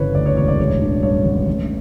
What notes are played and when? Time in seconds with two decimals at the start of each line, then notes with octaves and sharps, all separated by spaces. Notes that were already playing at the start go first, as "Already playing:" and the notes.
Already playing: G1 C#3 E3 B4 C#5
0.15 D2 D5
0.26 C#5
0.37 E1 C#5
0.48 D5
0.59 A1 C#5
0.82 D3
1.03 G2 C#5
1.25 A1
1.47 A1